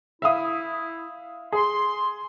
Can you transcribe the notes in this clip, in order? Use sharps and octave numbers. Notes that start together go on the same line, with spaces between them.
E4 E5 F5 D#6
G#4 C6